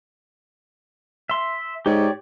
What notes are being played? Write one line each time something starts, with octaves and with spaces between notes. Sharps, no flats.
E5 C6
G#2 G4 C#5 D5